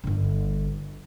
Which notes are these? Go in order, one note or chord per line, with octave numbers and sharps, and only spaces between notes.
G1 D3